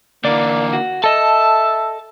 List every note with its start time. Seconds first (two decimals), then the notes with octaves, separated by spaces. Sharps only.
0.25 D3 E3 A#3 D5
0.73 F#4
1.04 A4 D#5 E5 A5